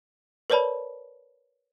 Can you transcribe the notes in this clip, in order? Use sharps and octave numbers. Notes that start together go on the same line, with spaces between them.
A#4 B4 C#5 D5 A5 B5